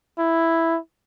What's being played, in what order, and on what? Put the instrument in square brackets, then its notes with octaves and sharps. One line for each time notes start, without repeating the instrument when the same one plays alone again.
[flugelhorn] E4